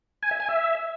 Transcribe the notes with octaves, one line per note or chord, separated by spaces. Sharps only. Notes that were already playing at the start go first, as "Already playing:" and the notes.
G#5
E5
G#5
E5